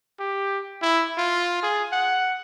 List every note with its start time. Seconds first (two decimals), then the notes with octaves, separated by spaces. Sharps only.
0.20 G4
0.82 E4
1.17 F4
1.63 G#4
1.92 F#5